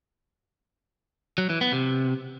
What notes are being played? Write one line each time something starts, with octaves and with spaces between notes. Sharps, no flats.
F#3
E3
B3
C3